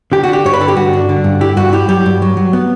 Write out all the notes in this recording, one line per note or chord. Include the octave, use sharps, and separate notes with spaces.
D3 G4
F#4
D4 G4
G2 C#5
B4
D3 A4
G4
G2 F#4
D4
D3
G2
E4 G4
G2 F#4
E4 G4
F#3 G4
G2
F#3
F#3
B3